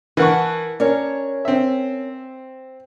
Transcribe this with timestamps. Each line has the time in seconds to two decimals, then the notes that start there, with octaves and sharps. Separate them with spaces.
0.17 E3 A#4 F#5 A5 C#6
0.80 C#4 D4 A#4 C#5
1.45 C4 E5